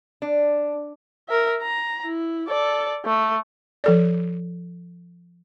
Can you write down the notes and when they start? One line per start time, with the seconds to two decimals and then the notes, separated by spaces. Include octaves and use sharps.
0.22 D4
1.29 A#4 E5
1.62 A#5
2.06 E4
2.48 A4 D5
3.05 A3
3.84 F3 A4 D5